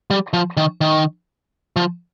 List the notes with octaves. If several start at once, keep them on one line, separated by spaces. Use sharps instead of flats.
G3
F3
D#3
D#3
F3